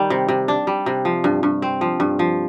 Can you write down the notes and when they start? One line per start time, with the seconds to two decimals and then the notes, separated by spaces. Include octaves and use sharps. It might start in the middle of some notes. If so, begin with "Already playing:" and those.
Already playing: D#3 G3
0.10 C3
0.28 C3
0.48 D4
0.67 G3
0.86 C3
1.05 F3
1.24 G2
1.43 G2
1.62 C4
1.81 F3
2.00 G2
2.19 F3